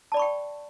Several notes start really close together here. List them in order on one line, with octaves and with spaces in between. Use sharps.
A5 D5 B5 C#6 G5